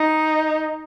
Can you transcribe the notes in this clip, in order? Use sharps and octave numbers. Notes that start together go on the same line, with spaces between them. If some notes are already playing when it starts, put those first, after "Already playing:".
Already playing: D#4